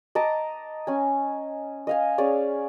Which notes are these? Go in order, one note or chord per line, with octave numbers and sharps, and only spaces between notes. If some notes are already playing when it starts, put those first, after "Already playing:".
D#5 A5 A#5 D6
C#4 G#5
D#5 F5 G#5
C#4 G#4 D5